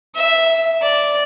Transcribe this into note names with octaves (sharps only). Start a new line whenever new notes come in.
E5
D5